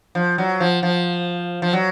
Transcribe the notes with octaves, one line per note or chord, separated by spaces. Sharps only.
F3
F#3
F3
F3
F3
F#3